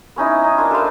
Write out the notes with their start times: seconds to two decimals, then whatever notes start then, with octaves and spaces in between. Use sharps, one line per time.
0.16 B3 C#4 D#4 E4
0.44 D#4
0.58 A#3 D4 F4
0.71 A4 B4 C5 F5